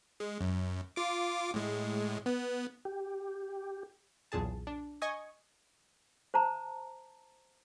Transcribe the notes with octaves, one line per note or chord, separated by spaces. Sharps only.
G#3
F#2
F4 D6
A2 G#3
B3
G4
B1 E2 A#2 G#4 A5
D4
D#5 G#5 C#6 D#6 G#6
C5 A5 A#5